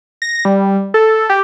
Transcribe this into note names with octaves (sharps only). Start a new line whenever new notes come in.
A#6
G3
A4
G4